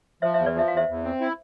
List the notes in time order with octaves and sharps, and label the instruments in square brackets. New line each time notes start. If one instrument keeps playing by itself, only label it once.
[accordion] F3 [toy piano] C5 E5
[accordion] E2 [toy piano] C5 E5
[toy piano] B4 D5
[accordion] F3 [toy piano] E5
[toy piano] F5
[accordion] E2 [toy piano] C5 E5
[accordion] E2
C4
E4